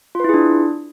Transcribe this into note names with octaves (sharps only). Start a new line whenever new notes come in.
D4 E4 F4 G#4 B4